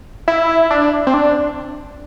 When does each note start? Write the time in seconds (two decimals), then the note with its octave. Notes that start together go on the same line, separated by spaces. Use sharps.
0.28 E4
0.70 D4
1.07 C4
1.14 D4